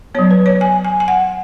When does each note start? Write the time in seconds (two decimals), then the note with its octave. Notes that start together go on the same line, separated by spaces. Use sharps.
0.15 F#3 B3 C#5
0.31 B4
0.46 C#5
0.61 G#5
0.85 G#5
1.00 G#5
1.08 F#5